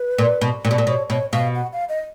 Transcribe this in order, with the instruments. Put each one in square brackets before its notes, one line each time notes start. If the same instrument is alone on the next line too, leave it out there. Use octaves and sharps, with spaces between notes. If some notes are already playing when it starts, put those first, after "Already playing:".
Already playing: [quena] B4
[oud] A#2
B2
A#2
B2
A#2
[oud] B2 [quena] C#5
[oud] B2 [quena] C#5
[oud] B2 [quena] F5
[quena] F#5
F5
D#5